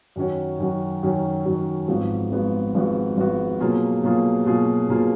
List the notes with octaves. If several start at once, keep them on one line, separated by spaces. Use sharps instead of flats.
F#2 D#3 F#3 C#4 F#4
F#2 D#3 F#3 C#4 F#4
F#2 D#3 F#3 C#4 F#4
F#2 D#3 F#3 C#4 F#4
G#1 G#2 F3 B3 F#4
G#1 G#2 F3 B3 F#4
G#1 G#2 F3 B3 F#4
G#1 G#2 F3 B3 F#4
B2 F#3 A#3 F4 G#4
B2 F#3 A#3 F4 G#4
B2 F#3 A#3 F4 G#4
B2 F#3 A#3 F4 G#4